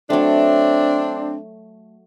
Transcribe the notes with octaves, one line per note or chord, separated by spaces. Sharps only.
F#3 A3 C4 D4